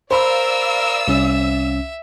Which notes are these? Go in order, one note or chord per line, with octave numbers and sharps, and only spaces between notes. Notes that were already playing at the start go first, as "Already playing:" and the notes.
A#4 C5 D5 F5 B5 E6
C2 C#4 E5